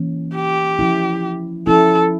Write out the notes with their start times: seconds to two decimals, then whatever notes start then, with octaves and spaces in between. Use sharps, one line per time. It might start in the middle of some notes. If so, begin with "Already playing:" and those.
Already playing: E3 A#3 C#4
0.35 G4
0.79 F3 C#4 E4
1.67 F3 C#4 E4 A4